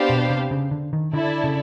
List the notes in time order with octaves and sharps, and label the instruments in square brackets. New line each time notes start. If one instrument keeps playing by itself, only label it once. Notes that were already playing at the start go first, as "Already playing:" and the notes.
Already playing: [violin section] B3 D4 G4 C5 F5
[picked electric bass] B2
C3
C#3
D3
D#3
[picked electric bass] D3 [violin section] E4 A4 D5
[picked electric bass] C#3